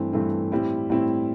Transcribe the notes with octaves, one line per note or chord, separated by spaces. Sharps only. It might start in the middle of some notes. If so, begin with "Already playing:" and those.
Already playing: G2 E3 A3 C4 E4
G2 E3 A3 C4 E4
A2 G3 C4 E4
A2 G3 C4 E4